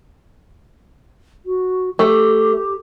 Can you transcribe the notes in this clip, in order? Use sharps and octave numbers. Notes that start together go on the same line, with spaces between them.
F#4
A3 G4